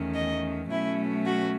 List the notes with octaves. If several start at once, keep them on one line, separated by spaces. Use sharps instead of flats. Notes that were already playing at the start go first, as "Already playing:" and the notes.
Already playing: E2 D#3 A3 C#4
D#5
B2 F#3 A3 C#4 E4
F#4